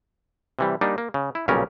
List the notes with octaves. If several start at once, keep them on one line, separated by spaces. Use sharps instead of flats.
C3 E3 G3
G3 A#3 D4 D#4
A#3
C#3
E4
B1 A#2 C#3 G3 C#4 A#4